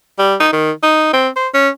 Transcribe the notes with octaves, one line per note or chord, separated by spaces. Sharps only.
G3
D#4
D#3
D#4
C4
C5
C#4